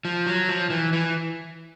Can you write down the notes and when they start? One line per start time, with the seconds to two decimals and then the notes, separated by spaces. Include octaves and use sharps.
0.05 F3
0.27 F#3
0.49 F3
0.70 E3
0.93 E3